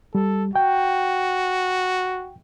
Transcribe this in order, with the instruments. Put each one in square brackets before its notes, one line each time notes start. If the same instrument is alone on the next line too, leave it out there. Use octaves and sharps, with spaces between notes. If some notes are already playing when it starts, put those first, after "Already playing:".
[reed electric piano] G3 [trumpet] A4
[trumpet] F#4 [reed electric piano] G5